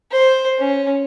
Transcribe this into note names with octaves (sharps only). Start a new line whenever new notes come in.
C5
C#4